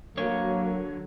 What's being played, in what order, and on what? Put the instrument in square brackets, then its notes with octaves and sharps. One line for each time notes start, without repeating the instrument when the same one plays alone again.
[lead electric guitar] D3 C#5 [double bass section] F#3 [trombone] A#3